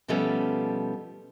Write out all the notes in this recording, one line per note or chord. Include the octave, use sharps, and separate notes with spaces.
B2 F3 G3 A3 B3 C#4